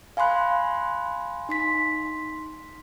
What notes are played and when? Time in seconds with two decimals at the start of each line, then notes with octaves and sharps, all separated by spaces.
0.17 F5 G#5 B5 C6 F#6
1.49 D#4 C6 B6